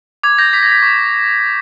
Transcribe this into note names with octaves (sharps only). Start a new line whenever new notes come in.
D6 G#6
G6 A#6
D6 B6
A#6
G6
B6
C#6 B6